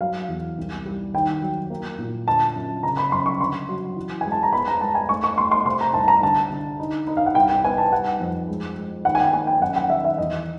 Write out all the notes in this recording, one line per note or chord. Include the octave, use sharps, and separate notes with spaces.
F#3 F5
E2
C2
G3
D#2 G5
F#3
A#3
A#2
D3 A5
F#2
C#3 A#5
B5
F#2 C6
C#6
D3 C6
F#3
E3
G#3 G#5
A5
A#5
B3 B5
A#5
G#3 A5
G#5
A3 C#6
C#6
A3 C6
C6
C3 C6
A#5
C2 A5
A#5
D3 A5
D3
D#4
D#4
F5
F#5
C2 G5
G5
B3 G#5
A5
G3 F#5
F2
G#3
G#3
D#2 F#5
G#5
G5
A#3 G#5
G5
F#2 F#5
F#5
D#3 E5
E5
E2 D#5